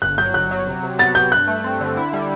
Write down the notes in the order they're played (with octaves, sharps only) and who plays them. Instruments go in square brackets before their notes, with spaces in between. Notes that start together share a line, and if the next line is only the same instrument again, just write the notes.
[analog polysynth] G1 [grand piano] F#6
[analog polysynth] F#3 [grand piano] G6
[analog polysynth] G1 [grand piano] F#6
[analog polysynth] F#3
C3
C3
[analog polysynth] B3 [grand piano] A6
[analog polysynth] C3 [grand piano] G6
[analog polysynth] G2 [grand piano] F#6
[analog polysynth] A3
C4
D3
E4
G3